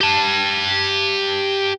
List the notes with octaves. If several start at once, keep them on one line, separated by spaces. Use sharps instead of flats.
G4 A5